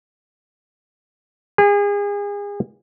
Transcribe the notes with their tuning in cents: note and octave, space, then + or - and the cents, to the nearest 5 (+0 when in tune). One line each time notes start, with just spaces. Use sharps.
G#4 -35